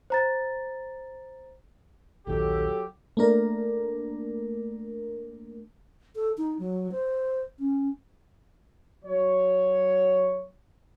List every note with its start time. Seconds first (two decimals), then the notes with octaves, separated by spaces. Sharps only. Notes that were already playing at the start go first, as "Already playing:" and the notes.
0.10 C5 A#5 A6
2.27 A#1 D#2 D#3 F#3 G4 A4
3.17 A3 A#3 D4 A#4
6.16 A4
6.38 D#4
6.59 F#3
6.92 C5
7.59 C#4
9.04 F#3 C#5